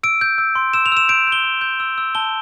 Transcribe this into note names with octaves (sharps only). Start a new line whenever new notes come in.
E6 D7
G6
E6
C6
E6 E7
F7
E6 E7
G6 D7
G6
G7
E6
G6
E6
E6
A5 G7